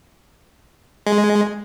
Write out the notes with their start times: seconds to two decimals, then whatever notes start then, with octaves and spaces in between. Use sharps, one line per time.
1.06 G#3